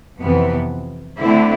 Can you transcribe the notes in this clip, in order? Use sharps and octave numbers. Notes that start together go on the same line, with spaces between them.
F2 C3 E3 B3
D3 A3 C4 E4